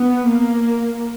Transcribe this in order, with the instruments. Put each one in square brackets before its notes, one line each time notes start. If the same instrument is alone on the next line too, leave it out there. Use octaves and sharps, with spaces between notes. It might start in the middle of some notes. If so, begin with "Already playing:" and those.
Already playing: [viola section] B3
A#3